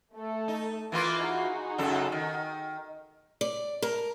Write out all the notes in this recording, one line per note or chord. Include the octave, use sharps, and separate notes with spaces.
A3 A4
D#4
E3 A#3 F4 B4 D6 A6
D#4 F#4 G#4
F#2 C#3 A4
D#3
D5
A#4